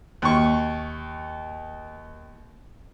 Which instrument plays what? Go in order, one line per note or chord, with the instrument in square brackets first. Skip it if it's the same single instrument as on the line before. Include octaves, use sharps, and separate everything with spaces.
[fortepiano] D#2 C#6